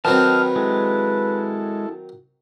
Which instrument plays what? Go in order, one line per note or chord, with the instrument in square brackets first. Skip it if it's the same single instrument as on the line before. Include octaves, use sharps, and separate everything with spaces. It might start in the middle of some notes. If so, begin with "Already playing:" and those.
[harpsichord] D#3 F#3 C4 [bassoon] B4 [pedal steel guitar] C5 A5 [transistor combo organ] D#5 F6
[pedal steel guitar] G#3 [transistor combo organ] E4 A4